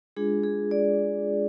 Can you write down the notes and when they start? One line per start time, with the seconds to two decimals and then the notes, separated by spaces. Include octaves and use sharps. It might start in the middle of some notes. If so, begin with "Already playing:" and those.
0.17 G#3 D4 F4 G#4
0.43 G#4
0.71 D5